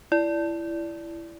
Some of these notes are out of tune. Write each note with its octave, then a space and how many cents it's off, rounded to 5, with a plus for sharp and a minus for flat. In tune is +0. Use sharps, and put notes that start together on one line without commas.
E4 +20 D5 -10